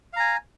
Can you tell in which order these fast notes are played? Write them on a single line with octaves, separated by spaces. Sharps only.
F5 A#5 G#5